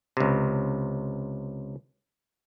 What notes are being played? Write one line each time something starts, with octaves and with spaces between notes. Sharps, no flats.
C#2 C3